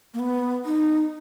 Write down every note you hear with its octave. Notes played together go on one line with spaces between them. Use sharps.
A#3
B3
D#4